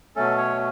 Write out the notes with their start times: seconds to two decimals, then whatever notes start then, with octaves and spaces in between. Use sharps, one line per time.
0.16 B2 F#3 A3 C#4 A4
0.37 C#5